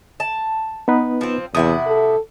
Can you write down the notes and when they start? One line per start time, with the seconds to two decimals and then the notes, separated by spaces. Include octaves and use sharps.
0.20 A5
0.88 B3 D#4 B4
1.21 F3 C4
1.55 E2 C3 E4 F#5 D#6
1.87 A4